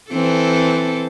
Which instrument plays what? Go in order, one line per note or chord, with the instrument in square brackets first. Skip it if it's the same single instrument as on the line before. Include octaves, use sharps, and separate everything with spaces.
[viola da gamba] E3 C4 A4